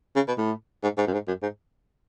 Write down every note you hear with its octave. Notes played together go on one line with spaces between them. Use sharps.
C#3
B2
A2
G#2
G#2
F#2
G#2
F#2
G#2